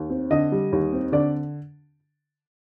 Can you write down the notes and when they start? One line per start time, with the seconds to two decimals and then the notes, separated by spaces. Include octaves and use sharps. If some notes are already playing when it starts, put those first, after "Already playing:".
Already playing: D#2
0.10 C4
0.30 D3 D#5
0.52 G3
0.72 D#2
0.92 C4
1.12 D3 D5